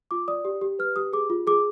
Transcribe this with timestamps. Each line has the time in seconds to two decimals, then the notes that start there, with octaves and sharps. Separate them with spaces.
0.11 F4 D6
0.28 D5 D#6
0.45 G4
0.61 G4
0.79 B4 F6
0.96 G4 D#6
1.13 G#4 D6
1.30 F4
1.47 G#4 D6